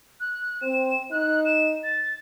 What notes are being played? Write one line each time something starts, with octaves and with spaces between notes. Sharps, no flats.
F#6
C4 E7
D#4 F#6
E7
A6